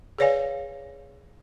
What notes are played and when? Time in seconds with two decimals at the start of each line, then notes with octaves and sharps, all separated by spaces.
0.18 G#4 B4 C#5 D5 F5 G#5